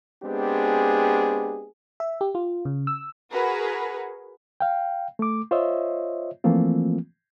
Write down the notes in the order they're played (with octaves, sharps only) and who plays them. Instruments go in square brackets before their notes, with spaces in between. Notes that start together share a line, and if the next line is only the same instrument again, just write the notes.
[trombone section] G#3 B3 C4 D4 G4 G#4
[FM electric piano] E5
G4
F4
C#3
E6
[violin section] F#4 G#4 A#4 B4
[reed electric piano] F5 G5
A3 D6
F4 C5 C#5 D#5 E5
E3 F3 A3 A#3 C4 F4